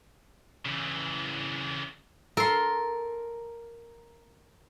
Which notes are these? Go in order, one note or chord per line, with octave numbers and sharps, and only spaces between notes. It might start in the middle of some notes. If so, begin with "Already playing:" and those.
C#3 E3
A4 A#4 C6